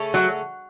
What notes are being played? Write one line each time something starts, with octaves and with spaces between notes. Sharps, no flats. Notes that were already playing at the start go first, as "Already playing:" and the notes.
Already playing: C#3 A3 C#4 A4
F#3